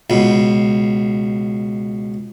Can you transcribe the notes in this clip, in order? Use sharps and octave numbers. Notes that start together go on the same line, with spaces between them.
C#2 B2